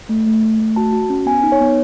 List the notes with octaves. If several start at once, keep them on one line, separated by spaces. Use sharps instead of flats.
A3
A3
A3
A3
F#4 A5
F#4
C#4
B3 G#5
D#4
C#5
B3